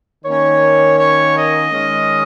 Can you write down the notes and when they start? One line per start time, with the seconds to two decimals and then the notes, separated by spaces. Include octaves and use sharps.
0.25 D#3 A#3 C#4 C#5
0.98 C#5
1.35 D#5
1.71 D#3 G#3 C#4